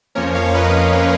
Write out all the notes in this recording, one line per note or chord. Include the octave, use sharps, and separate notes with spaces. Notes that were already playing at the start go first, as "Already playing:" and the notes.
F2 F3 A#3 C#4 A#4 C#5
C#5 F5
B4 D#5